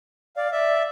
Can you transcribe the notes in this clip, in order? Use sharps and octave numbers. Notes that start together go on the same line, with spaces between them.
D5 F5
D5 E5